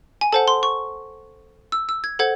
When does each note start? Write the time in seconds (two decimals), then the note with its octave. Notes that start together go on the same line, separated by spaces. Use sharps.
0.21 G#5
0.32 A4 C5 F#5 A5
0.48 C6
0.63 C#6
1.72 E6
1.89 E6
2.04 G#6
2.19 A4 C5 F#5 G#6